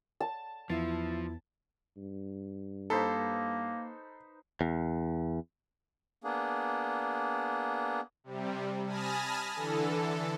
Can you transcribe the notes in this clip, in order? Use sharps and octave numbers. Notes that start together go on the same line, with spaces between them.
A5
E2 F3 B3 E4 A6
G2
A#3 D#4 A4 B4 C5
E2
A#3 B3 D4 G#4
C3 G3
G#5 A5 B5 D#6 F6 A#6
D3 E3 A4